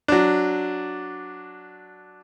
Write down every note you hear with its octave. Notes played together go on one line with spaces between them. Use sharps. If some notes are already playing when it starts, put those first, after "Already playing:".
F#3 D4